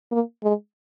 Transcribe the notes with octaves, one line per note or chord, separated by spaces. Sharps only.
A#3
G#3